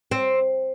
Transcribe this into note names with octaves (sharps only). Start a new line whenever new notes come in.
C4